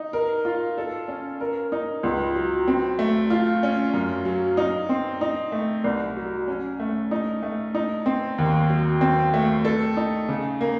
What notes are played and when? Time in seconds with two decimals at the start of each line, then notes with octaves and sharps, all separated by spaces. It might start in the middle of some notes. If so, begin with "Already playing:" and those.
Already playing: D#4
0.13 A#4
0.45 F4
0.78 A4
1.08 C#4
1.41 A#4
1.72 D#4
2.03 C#2
2.35 F#3
2.68 C4
2.99 A3
3.30 F4
3.63 C#4
3.94 F#2
4.25 F#3
4.57 D#4
4.89 C4
5.21 D#4
5.52 A3
5.84 C2
6.17 F#3
6.48 C#4
6.80 A3
7.11 D#4
7.43 A3
7.75 D#4
8.06 C4
8.38 D#2
8.69 F#3
9.01 C4
9.34 A3
9.65 A4
9.97 D#4
10.29 C#3
10.61 A#3